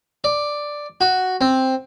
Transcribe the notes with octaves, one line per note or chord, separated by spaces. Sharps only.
D5
F#4
C4